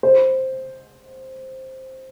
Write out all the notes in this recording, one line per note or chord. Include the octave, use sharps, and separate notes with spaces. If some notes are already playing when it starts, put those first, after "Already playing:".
C5